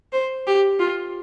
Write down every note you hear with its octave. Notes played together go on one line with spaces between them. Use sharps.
C5
G4
F4